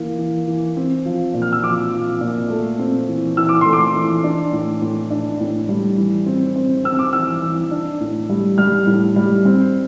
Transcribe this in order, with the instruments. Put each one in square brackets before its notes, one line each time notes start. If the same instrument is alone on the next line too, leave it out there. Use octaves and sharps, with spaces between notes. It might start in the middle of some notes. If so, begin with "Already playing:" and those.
Already playing: [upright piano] E3 A#3
E3
E3
C4
F3
A#2
F6
E6
F3 D6
F3
A#2
A3
C4
E3
E3 E6
D6
A3 C6
D6
E3
D4
A2
A2
D4
A2
G3
E3
C4
C4
C4 E6
D6
E3 E6
E3
D4
A2
G3
G3 F6
A2
G3
C4